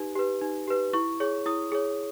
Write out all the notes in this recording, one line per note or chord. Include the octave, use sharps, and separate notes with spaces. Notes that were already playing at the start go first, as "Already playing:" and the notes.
Already playing: D#4 G4 B4
G4 B4
D#4
G4 B4
E4 C#6
G#4 C#5
E4 D#6
G#4 C#5